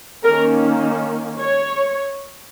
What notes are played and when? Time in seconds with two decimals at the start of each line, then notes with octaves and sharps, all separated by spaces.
0.23 D#3 A#3 C#4 A#4
1.39 C#5